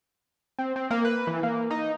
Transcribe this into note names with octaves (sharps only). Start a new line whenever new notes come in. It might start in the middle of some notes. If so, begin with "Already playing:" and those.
C4
C4
A#3
B4
E3
A#3
D#4